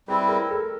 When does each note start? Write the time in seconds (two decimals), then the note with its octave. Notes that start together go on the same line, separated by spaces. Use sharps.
0.08 G3 C4 E4 B4
0.29 A#4
0.51 A4